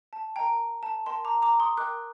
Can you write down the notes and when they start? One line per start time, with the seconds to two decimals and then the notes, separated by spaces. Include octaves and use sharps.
0.13 A5
0.36 A#4 D#5 G5 A#5
0.83 A5
1.06 A#4 D#5 G5 A5 C6
1.25 A#5 D6
1.42 A#5 D6
1.60 C6 D#6
1.77 A#4 D#5 G5 D6 F#6